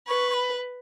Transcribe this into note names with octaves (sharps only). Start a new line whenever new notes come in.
B4 C#6
C#6
B5